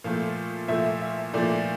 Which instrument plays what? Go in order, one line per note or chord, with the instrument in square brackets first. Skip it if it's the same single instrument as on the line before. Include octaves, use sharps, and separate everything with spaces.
[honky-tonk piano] A#2 F3 A3 F5
A#2 F3 A3 E5
E5
A#2 F3 A3 D5